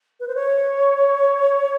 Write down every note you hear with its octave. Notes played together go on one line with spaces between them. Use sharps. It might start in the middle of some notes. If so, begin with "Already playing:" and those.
B4
C5
C#5